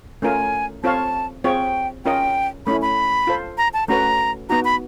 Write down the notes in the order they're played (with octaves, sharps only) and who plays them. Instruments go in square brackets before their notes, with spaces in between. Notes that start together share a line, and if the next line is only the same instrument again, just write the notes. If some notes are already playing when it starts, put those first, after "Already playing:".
[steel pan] A3 C#4 F4 A#4 [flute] G#5
[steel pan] C4 F4 A4 C#5 F5 [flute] A5
[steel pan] C4 F4 G#4 C#5 [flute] G5
[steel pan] C#4 F4 A#4 D#5 [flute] G5
[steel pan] A3 C#4 E4 [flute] B5
[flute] B5
[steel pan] F4 A4 C5
[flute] A#5
A5
[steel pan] A3 C#4 F#4 B4 [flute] A#5
[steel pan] B3 D#4 F#4 [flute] A#5
[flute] B5